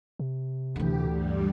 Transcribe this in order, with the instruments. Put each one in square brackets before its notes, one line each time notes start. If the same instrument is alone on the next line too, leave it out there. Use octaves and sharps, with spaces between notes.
[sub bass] C3
[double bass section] D2 A#2 [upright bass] D3 E3 [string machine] G4
[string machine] G2 G3